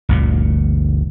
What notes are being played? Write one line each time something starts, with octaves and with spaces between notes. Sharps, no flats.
G1 D2 A#2